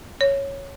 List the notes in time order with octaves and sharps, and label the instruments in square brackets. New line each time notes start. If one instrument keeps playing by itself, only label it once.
[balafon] C#5